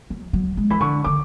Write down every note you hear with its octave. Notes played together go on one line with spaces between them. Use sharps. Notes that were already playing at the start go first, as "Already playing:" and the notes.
F#3
F#3
G#3
E3 B5
D3 C#6
D3 D6